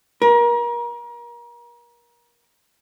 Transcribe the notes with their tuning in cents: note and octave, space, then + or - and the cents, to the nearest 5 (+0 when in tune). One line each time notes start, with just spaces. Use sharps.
A#4 +35